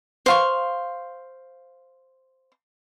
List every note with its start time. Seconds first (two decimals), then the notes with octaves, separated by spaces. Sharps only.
0.26 C5 F5 C#6